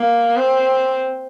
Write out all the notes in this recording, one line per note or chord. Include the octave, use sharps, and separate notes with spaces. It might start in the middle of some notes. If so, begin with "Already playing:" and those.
Already playing: A#3
C4